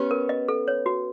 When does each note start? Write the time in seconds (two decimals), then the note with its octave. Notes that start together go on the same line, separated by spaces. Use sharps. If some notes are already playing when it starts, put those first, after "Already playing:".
Already playing: B3 C#4 G4
0.11 A#4
0.29 D#5
0.48 A4
0.68 C#5
0.86 F#4